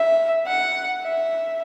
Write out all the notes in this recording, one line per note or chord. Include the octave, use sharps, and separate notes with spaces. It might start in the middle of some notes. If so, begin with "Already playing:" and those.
Already playing: E5
F#5
E5